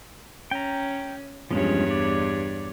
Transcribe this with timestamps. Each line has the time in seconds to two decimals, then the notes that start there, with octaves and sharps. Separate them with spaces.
0.51 C#4 G5 A#5
1.51 E2 G2 F3 G#3 C#4 C#5
1.91 D5